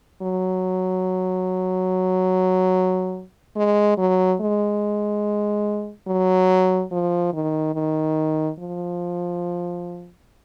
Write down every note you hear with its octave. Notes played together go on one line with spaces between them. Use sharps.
F#3
G#3
F#3
G#3
F#3
F3
D#3
D#3
F3